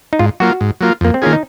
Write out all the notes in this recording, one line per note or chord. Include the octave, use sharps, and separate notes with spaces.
D#4
G#2 F4
F#3 A#3 F4 F#4
G#2
F#3 A#3 F4
F2 A#3
C4
D#3 A#3 C#4 F4 G#4
D#4